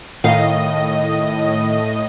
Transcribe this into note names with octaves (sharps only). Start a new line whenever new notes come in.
A2 D#3 D#5 F5